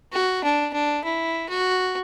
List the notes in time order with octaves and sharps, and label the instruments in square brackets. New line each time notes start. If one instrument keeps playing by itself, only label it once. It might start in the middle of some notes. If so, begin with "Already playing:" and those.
[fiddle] F#4
D4
D4
E4
F#4